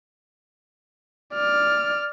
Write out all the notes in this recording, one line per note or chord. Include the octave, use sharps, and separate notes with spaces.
D5 F6